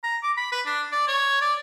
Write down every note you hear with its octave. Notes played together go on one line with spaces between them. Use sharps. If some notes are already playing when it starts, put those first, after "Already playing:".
A#5
D6
B5
B4
D4
D5
C#5
D5